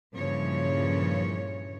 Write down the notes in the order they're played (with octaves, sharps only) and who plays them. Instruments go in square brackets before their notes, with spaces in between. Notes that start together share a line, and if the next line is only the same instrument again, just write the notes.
[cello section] G2 A#2 C#3 E3 F3 C#5